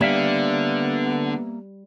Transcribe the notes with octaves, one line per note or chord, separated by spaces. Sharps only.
D3 G3 A#3 B3 E5 F5